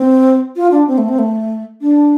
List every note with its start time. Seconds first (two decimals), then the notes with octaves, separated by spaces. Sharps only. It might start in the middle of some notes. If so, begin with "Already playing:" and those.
Already playing: C4
0.56 F4
0.71 D4
0.87 C4
0.98 A3
1.09 C4
1.19 A3
1.81 D4